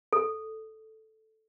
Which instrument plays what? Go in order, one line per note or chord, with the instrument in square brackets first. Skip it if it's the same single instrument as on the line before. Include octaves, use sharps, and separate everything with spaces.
[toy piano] A4